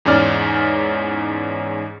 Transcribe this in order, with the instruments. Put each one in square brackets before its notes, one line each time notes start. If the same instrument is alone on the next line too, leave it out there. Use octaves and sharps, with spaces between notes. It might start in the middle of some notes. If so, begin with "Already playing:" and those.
[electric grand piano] E2 G#2 C#4 D5 F6